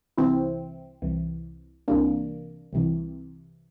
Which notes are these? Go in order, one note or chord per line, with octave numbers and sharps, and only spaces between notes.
C2 C3 E3 C4 E4
C2 C3 E3
C2 C3 E3 A#3 D4
C2 C3 E3